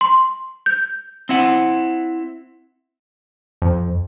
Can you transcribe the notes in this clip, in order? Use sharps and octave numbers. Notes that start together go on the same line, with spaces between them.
C6
G6
C4 E4 F#5
F2